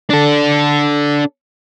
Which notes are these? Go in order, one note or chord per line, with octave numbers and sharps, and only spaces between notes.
D4 A4